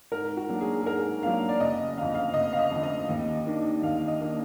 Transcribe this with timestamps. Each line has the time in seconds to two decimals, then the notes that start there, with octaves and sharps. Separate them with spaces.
0.12 G#2 A#4
0.37 F#4
0.49 F#3 A#3 D4
0.61 G#4
0.81 G#4
0.86 G#2 A#4
1.23 F#3 A#3 D4 F5
1.49 D5
1.60 F#1 D#5
1.97 F2 D3 F5
2.15 F5
2.34 F#1 D#5
2.53 F5
2.59 D#5
2.71 F2 D3
2.83 D#5
3.08 D#2
3.46 D#3 A#3 D4
3.82 D#2 F5
4.08 D#5
4.21 D#3 A#3 D4